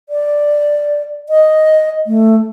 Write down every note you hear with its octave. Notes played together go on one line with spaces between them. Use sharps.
D5
D#5
A3